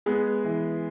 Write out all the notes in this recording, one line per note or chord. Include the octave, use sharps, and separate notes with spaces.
G#3 B3 G#4
E3